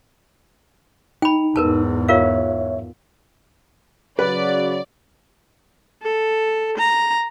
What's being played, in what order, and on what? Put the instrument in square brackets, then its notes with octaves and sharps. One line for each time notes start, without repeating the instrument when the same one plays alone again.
[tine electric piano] D#4 [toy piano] G5 B5
[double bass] E2 G#2 [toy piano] A#4 B4 A5
[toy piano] F4 A#4 F5 [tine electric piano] C#5 E5
[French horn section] C#3 F#3 [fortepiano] B4 [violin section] D5
[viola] A4
A#5